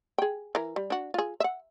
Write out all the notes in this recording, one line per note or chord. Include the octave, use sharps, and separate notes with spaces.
G#4 G5
E3 A#4
G3
D4 F#4
F4 G#4
E5 F#5